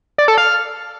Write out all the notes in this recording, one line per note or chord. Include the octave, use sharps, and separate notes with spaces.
D5
A4
F5